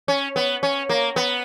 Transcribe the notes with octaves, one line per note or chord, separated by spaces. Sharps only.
C#4
B3
C#4
A#3
B3